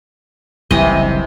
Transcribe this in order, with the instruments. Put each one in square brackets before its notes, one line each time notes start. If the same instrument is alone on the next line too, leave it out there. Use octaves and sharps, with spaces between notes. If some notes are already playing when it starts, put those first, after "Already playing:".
[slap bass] F#1 C2 [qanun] C3 E3 D#5